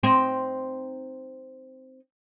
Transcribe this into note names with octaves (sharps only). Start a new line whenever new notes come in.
C4 D#4